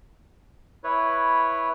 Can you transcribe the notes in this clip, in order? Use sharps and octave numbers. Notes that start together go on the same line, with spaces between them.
E4 B4 C#5